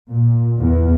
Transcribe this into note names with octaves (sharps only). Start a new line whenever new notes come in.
A#2
E2